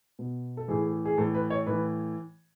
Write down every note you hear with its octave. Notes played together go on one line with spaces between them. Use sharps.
B2
A4
A2 E3 G#4
G#4
A2 E3 A4
B4
C#5
A2 E3 B4